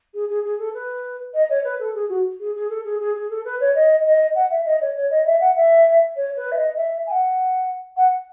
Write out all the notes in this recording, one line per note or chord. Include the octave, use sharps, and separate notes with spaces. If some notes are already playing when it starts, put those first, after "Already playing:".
G#4
G#4
G#4
A4
B4
D#5
C#5
B4
A4
G#4
F#4
G#4
G#4
A4
G#4
G#4
G#4
A4
B4
C#5
D#5
D#5
F#5
E5
D#5
C#5
C#5
D#5
E5
F#5
E5
C#5
B4
E5
D#5
E5
G#5
F#5
F#5